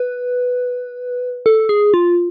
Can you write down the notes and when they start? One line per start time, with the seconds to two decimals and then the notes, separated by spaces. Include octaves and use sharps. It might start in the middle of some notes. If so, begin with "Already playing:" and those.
Already playing: B4
1.46 A4
1.69 G#4
1.94 F4